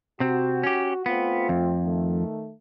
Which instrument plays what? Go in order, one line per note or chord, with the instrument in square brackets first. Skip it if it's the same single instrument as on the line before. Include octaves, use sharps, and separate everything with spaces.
[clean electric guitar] C3 C4 [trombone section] F#4
[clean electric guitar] C#4 G4
[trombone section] A3 C4 F4 [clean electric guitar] B3
[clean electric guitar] F2
[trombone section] D#3 A3